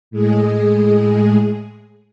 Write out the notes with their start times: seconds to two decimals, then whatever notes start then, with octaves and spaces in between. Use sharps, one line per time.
0.11 A2 G#3 G#4